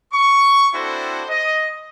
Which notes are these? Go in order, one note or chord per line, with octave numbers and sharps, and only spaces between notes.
C#6
C4 D4 E4 F#4 A4 C5
D#5